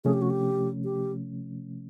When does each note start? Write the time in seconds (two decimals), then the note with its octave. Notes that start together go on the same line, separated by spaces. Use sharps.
0.05 C3 F3 A3 C#4 G#4
0.13 G4
0.22 F#4
0.30 G4
0.84 G4